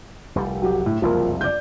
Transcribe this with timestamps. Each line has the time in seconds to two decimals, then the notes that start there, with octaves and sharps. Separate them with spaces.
0.35 F1 C2 G3
0.62 F#3 G4
0.86 A2
1.02 F#1 C2 F2 F3 A#3
1.41 D5 G6